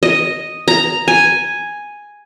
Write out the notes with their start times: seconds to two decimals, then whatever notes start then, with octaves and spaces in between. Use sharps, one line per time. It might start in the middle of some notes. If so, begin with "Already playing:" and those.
0.03 D#5
0.68 A#5
1.08 G#5